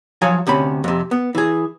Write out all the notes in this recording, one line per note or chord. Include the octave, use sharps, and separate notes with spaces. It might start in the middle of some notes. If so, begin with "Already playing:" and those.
F3 F#3 C#5 F5 G#5
D2 C3 C#4 B5
F2 C3
B3
E3 G#4